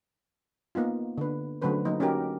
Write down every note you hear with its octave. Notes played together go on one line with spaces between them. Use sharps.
A#3 B3 D#4 F4
D3 B4
D3 F#3 A3 C#4 B4 C5
F#3 A#3 D#4
C#4 D#4 F#4 G4 A#4